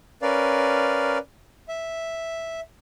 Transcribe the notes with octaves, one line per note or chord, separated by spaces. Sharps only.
C#4 A#4 B4 D5 F5
E5